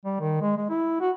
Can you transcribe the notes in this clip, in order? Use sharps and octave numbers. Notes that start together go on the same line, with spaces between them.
G3
D#3
G#3
G#3
E4
F#4